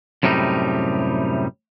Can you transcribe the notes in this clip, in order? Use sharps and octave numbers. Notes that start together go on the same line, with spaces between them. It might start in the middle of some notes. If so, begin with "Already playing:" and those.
F#2 A2 C3 G3 D#4